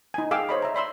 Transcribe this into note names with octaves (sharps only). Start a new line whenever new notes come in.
D#4 G#5
G#4 F5 G5 G#5 D6 E6
C5 C#5 D#5 B5
E5 A#5
D5 B5 C6 E6